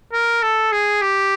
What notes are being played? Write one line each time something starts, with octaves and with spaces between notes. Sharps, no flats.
A#4
A4
G#4
G4